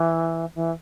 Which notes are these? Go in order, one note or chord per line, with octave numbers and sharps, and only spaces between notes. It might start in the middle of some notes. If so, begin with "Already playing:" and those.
Already playing: E3
E3